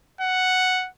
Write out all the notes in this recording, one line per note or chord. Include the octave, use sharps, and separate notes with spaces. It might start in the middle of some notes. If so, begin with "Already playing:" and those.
F#5